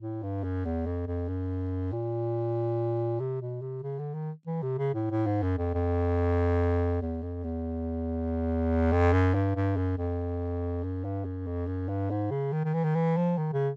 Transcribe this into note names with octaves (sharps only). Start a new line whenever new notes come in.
A2
G2
F#2
E2
F2
F2
F#2
A#2
C3
B2
C3
C#3
D3
D#3
E3
C3
C#3
A2
A2
G#2
F#2
F2
F2
E2
F2
E2
F2
F#2
G2
G2
F#2
F2
F#2
G2
F#2
F2
F#2
G2
G#2
C#3
D#3
D#3
E3
D#3
E3
F3
D#3
C#3